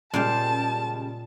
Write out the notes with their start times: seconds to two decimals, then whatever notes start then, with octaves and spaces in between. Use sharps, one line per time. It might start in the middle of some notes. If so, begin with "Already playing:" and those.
0.14 A#2 C#3 G3 G#3 C5 F5 A5